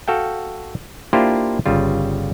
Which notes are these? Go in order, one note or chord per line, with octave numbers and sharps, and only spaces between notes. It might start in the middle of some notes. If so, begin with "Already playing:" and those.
F#4 A4 F5 G5
A#3 D4 E4 F4 G4 C5
G1 C#3 G3 F4